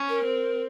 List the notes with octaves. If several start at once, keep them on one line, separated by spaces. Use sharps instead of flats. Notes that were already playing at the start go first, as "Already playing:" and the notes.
Already playing: C#4
A#4
C4